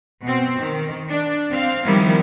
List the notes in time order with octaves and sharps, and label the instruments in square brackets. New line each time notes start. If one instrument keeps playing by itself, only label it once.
[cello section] B2 C4
D#3
D4
C4 F5
D#3 F3 G3 B3 E4